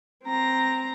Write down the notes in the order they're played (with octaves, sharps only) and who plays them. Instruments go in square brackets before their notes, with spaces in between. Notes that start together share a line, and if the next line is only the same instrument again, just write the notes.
[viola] C4 A#5